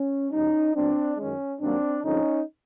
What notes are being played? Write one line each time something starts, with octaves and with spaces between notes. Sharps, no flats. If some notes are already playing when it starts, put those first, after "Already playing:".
Already playing: C#4
E2 B2 G3 C#4 D#4
A#2 F#3 B3 C4 D4
F#2 D#3 G#3 C#4
G2 D#3 F#3 A#3 C4 D4
G2 D3 F3 G#3 C4 C#4 D#4